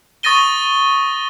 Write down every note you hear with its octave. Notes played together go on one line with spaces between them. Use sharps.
C#6 D#6 A6 A#6 D#7 G7